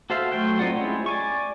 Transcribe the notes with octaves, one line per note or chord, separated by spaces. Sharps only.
F#4 A4 C5 E5 F5
F#3 A3 C5 G5 F#6
C4 D#4 F4 D5 F#5
G#3 C#4 E4 F4 G4
D5 G#5 C#6